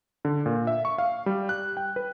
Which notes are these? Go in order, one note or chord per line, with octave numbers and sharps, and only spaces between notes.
D3
A#2
E5
C#6
F5
G3
F#6
G5
B4